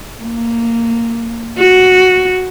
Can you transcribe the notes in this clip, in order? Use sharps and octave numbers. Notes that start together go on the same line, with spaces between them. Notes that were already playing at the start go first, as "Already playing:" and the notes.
A#3
F#4